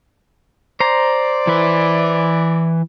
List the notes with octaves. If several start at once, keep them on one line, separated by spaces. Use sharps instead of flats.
C5 D5 A#5
E3 B4